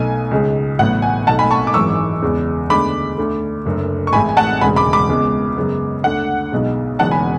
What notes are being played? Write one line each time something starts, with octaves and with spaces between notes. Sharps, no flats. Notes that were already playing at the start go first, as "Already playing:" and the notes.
Already playing: B1 B2 A3 G#5
C#2 C#3 G#3
A1 A2 F#3 B3 F#5
G#5
B1 B2 A3 F#5 A5
G#5 B5
A5 C#6
D6
G#1 F#2 E3 G#3 C#6 E6
E2 C#3 G#3 B3
D2 D3 G#3 B3 B5 D6
D2 D3 A3
F#1 F#2 D3 A3
C#6
A1 A2 G#3 G#5 B5
G#5
F#5 A5
E1 D2 C#3 G#3 G#5 B5
B5 D6
B5 D6
C#2 C#3 G#3 B3
F#2 C#3 G#3 B3
D2 D3 A3 F#5
B1 B2 G#3 B3
E1 E2 C#3 F#3 B3 F#5 A5
G#5 B5